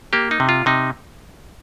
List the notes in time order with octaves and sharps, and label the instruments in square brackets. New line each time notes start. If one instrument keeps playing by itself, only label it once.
[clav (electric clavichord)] A#3 G4
D#4
C3
F4
C3 D#4